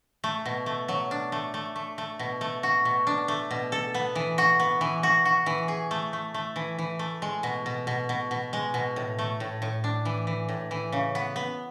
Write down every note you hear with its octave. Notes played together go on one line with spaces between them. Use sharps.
A3
B2
A3
F#3
D4
A3
A3
A3
A3
B2
A3
F#4
B2
D4
A3
B2
A4
B3
E3
F#4
B3
E3
F#4
F#4
E3
G#4
A3
A3
A3
E3
E3
A3
G#3
B2
B2
B2
B2
B2
G#3
B2
A2
A3
A2
A2
D4
E3
E3
A2
E3
C#3
B3
B3